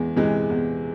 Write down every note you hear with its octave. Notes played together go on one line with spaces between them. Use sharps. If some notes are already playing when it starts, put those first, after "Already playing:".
Already playing: E2 E3 G#3
C3 E3 G#3
E2